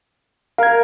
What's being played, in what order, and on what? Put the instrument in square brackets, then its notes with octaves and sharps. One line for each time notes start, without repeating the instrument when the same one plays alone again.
[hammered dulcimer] A#4 [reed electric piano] F5 G#6